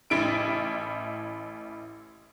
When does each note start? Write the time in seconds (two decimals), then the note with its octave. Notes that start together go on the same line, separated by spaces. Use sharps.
0.10 A1 E4 D7